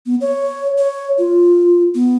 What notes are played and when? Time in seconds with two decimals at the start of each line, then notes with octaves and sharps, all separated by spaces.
0.06 B3
0.21 C#5
0.78 C#5
1.18 F4
1.95 B3